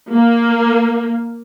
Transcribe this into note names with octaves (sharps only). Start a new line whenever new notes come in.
A#3